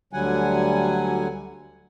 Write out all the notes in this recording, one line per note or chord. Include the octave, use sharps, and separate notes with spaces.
D2 D3 F#3 G3 F#5 G#5